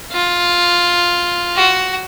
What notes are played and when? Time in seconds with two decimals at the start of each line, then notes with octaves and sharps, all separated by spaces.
0.12 F4
1.56 F#4